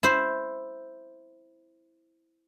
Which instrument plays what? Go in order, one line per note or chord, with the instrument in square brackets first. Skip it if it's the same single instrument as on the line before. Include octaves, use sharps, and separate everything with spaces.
[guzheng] E4 C5